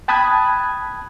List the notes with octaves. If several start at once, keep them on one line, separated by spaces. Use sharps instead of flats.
G5 A5 B5 D#6 F#6 G#6